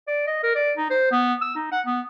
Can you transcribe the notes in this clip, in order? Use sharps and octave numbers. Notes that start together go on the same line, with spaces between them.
D5
D#5
A#4
D5
D#4
C5
B3
E6
D#4
F#5
B3